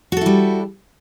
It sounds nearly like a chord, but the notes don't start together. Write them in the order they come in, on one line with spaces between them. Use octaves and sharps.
F#4 A4 E4 G3